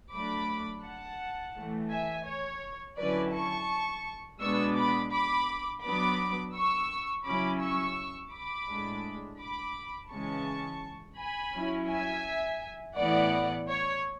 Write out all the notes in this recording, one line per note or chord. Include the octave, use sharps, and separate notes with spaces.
F#3 A3 D4 B5 D6
F#5 A5
A2 E3 A3
E5 G#5
C#5
D3 F#3 C#4 E4 B4 D5
A5 C#6
B2 G#3 B3 D4 C#6 E6
B5 D6
B5 D6
F#3 B3 D4 B5 D6
C#6 E6
C#3 F#3 C#4 E4 B5 D6
C#6 E6
B5 D6
A2 G#3 D4
B5 D6
C#3 E3 G#3 C#4 A5 C#6
G#5 B5
F#3 C#4 E4
E5 G#5
A2 E3 B3 E4 D5 F#5
C#5